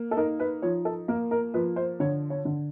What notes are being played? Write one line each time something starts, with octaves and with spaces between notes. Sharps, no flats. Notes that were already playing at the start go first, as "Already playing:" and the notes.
Already playing: A#3
A4
D#4 A#4
B4
F3 C#5
A4
A#3 A#4
A#4
F3 B4
C5
D3 C#5
C#5
D3